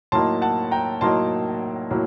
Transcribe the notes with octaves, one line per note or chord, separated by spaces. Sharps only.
A2 F#3 A#3 D#4 A5 C6
F#5 A5
G5 A#5
A2 F#3 A#3 D#4 A5 C6
A2 F#3 A#3